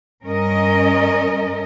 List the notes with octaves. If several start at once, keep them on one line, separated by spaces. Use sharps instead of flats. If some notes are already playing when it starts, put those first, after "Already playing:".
G2 C#4 A#4 D#5